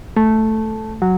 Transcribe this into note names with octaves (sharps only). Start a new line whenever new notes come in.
A3
F#3